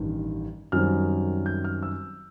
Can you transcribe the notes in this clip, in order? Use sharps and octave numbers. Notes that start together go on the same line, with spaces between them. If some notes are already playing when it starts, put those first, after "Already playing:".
Already playing: A1 G2 D#3
F#2 D#3 G3 C4 F6
G6
F6
E6